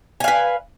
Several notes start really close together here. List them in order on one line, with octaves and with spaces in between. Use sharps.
G#5 F5 B4